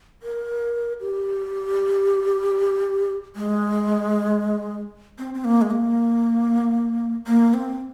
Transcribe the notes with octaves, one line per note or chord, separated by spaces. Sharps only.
A#4
G4
G#3
C4
C4
A#3
G#3
A#3
A#3
C4